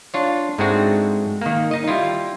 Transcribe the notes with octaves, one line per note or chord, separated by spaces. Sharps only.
D4 F4 C#5
G#2 G#3 A3 C4 D4 F#4
D#3 A#3
D#4 D#5
G3 E4 F4